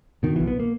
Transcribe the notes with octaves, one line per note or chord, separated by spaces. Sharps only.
B2 D#3
B1 E3
B3
A#3